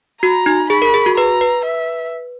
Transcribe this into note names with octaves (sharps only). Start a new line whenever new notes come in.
F#4 A#5
D#4
G#4 B5
A#4
G#4
F#4
B4 A#5
B4
E5